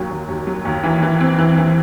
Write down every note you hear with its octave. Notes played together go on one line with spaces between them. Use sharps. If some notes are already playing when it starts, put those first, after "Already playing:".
Already playing: D#2 F#3
D#2
D#2
F#3
D#2
E3
E3
C4
E3
E3